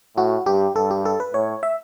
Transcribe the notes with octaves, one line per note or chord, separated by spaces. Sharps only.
A2 F#4
G2 G4
G2 A4
G4
A4
B4
A2 C#5
E5